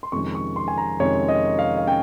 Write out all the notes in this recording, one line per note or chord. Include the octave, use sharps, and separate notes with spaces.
C6
F2 C3 D#3 G#3 C#4 C#6
C#6
C6
G#5
A#5
F2 C3 D#3 G#3 C#4 C#5
D#5
F5
F5
C#4 G5